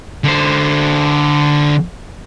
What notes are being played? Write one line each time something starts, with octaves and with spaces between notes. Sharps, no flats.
D3 C5